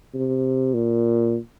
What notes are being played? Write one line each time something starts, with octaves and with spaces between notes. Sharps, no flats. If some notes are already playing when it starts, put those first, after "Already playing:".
C3
A#2